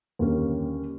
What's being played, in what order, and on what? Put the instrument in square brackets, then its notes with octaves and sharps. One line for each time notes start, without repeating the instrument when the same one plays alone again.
[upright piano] D#2 D3 G3 A#3 C#4